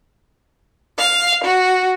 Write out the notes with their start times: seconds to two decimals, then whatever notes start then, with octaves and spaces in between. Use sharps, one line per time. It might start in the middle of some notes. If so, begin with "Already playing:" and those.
0.98 F5
1.44 F#4